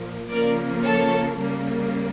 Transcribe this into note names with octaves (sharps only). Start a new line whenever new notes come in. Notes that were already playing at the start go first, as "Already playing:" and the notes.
Already playing: A#2 F3 A#3
C#3 F3 A#3 A#4 D5
A4 C#5
C#3 G3 A#3